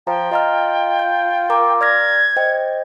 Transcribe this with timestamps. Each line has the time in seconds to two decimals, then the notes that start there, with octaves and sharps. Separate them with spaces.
0.07 F3 G5 A#5
0.32 F4 D#5 A#5 F6
0.99 G6
1.50 A#4 A#5 D6
1.81 D5 F6 G#6 A#6
2.37 C5 D#5 G5